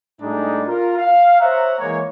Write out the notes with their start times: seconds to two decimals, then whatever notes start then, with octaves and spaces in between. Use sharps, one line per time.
0.21 A2 G3 G#3 D4 D#4
0.67 F4 A#4
0.97 F5
1.40 C5 C#5 E5 F#5 A#5
1.79 E3 G#3 A#3 C#5